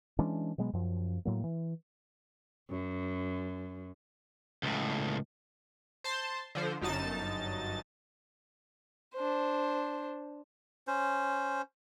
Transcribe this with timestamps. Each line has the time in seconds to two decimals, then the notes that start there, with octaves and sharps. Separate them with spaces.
0.19 E3 G#3 C#4 D4
0.58 B2 F#3 G#3 B3
0.73 F#2 F3
1.25 A2 F#3 A#3
1.44 E3
2.70 F#2
4.63 C#2 A2
6.04 C5 A5 C6
6.55 D3 F3 C5
6.81 G1 F#2 D#4 A5 A6
9.14 D4 C5
10.87 C#4 C5